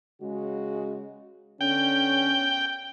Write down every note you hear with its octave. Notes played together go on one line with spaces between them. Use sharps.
C#3 G#3 F#4
D3 B3 C#4 G5